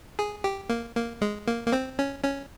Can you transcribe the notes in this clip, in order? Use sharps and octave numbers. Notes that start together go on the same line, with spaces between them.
G#4
G4
A#3
A#3
G#3
A#3
A#3
C4
C#4
C#4